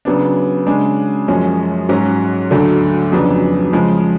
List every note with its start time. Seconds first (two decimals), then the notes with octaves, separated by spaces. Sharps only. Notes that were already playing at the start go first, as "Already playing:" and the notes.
0.05 C#3 F#3 B3 D4
0.67 C#3 G#3 D4
1.28 F#2 F3 G#3 C#4
1.89 G#2 F#3 C#4
2.50 D2 D3 F#3 A3 D4
3.12 F2 C#3 F#3 B3 D4
3.73 C#3 F3 G#3